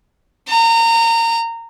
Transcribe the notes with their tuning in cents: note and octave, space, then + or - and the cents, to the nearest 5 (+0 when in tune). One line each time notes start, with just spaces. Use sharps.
A#5 -25